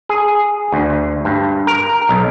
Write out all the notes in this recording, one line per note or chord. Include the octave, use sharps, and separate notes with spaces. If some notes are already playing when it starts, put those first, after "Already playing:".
G#4
D2
G2
A#4
B1